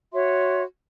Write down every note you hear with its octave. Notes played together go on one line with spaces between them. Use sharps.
F#4 C#5 E5 C6